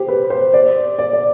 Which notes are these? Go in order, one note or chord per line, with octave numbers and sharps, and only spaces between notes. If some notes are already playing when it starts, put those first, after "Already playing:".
Already playing: G4 C5
B4
C5
D5
D5
D5